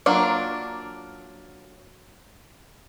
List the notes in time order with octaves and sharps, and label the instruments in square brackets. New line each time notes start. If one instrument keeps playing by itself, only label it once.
[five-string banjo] F#3 A#3 D4 F4